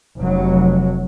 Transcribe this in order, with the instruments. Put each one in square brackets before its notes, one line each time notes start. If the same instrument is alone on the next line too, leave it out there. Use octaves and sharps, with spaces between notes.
[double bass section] F1 F#3